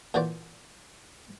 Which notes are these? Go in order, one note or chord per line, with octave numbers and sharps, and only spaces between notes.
A#2 E3 F#4 C5 D5